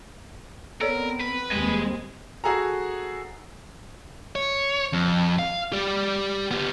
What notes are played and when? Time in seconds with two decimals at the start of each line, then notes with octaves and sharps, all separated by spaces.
0.81 B3 C4 A4 A#4 C#5 D5
1.21 B4
1.52 D#2 G3 G#3 C4 G#5
2.44 F#4 G#4 A4 A#5
4.35 C#5
4.93 F2
5.39 F5
5.72 G4 D5
6.51 B3 G4